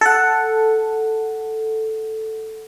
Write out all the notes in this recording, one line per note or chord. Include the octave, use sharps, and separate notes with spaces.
A4 F#5